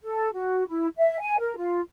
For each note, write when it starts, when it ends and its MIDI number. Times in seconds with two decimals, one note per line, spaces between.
0.01 0.29 69
0.33 0.67 66
0.68 0.87 64
0.97 1.20 76
1.20 1.37 80
1.39 1.55 70
1.57 1.81 65